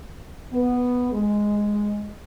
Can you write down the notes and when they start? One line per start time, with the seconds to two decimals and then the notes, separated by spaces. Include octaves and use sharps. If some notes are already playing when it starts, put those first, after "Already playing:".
0.53 B3
1.13 G#3